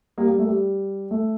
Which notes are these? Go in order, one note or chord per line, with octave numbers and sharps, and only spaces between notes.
G3 A#3
G3 A#3
A3
G3
A3